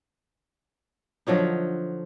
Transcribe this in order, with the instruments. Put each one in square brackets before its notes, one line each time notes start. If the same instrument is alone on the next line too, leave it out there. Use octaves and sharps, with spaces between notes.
[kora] D3 F3 F#3 D#4